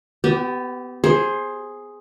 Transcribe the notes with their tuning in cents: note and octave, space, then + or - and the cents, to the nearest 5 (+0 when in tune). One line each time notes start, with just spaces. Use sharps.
B3 +20 G4 -20
G#4 +0 C5 +15